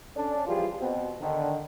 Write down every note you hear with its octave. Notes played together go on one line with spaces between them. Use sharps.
C#4 D4 A4
E3 F3 G3 F4 G4 G#4
B2 C4
D3 D#3